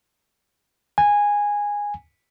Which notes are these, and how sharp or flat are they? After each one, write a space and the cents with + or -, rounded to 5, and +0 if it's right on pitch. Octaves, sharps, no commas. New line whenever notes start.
G#5 -10